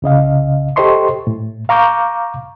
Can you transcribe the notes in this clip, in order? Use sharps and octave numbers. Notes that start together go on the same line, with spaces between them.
C2 C#3 D#5 F5
G4 A4 C5 D#5 C6 C#6
A2
F5 A#5 C#6 D6 F6 G6